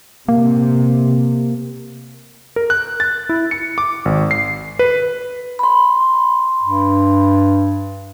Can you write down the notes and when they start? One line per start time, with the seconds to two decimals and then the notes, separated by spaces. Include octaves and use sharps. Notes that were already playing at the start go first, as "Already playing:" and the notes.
0.29 C3 A#3
2.56 A#4
2.70 F#6
3.00 A6
3.29 E4
3.51 C#7
3.78 D6
4.05 G#1
4.31 C7
4.79 B4
5.59 B5 C6
6.63 G2